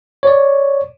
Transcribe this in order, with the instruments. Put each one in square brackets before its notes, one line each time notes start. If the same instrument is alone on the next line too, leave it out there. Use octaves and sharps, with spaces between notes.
[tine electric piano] C#5 D5